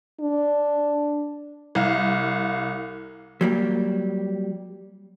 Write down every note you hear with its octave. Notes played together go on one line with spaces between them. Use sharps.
D4
C2 F5
F#3 G3 A#3